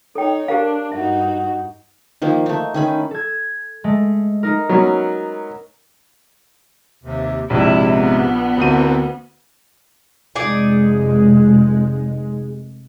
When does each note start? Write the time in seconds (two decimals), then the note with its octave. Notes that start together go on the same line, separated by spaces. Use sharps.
0.15 D#4 A4 C#5 G5
0.48 D4 G4 A#4 F5
0.92 G2 D#4 F#4 E5
2.22 D#3 F3 A#3
2.46 A3 D#4
2.74 D#3 C#4 B5
3.11 A4 G#6
3.84 G#3 A3
4.43 D#4 A#4
4.69 F#3 B3 C#4
7.03 D#2 C3
7.50 A#1 G#2 C3 E4
7.93 B3
8.57 D2 E3 A#3 C4 D#7
10.36 F1 G#3 D#4 G#4 D5